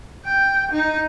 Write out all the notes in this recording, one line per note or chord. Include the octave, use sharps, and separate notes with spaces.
G5
D#4